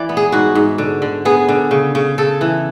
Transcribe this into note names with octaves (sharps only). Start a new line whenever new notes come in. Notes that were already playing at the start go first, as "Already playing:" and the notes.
Already playing: E3 D5
B3
G#4
G#2 F#4
G#2
D3
D3
B3 G#4
D3
C#3
C#3
C#3 A4
E3